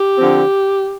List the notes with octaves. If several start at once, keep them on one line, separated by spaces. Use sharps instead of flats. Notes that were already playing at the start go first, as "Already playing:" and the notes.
Already playing: G4
D3 F3 C4